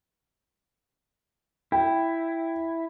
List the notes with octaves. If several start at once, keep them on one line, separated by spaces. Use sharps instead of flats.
E4 G5